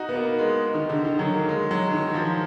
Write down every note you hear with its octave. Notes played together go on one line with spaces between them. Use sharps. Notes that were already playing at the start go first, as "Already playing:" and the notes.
Already playing: D#4 F#4
B3
A#3
G#3
D#3
D3
D#3
F#3
A#3
G#3
F#3
D#3
F3